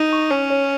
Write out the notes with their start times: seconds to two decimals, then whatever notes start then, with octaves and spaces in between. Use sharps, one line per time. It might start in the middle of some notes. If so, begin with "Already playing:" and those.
Already playing: D#4
0.13 C#6
0.31 C#4 C#5
0.50 C#5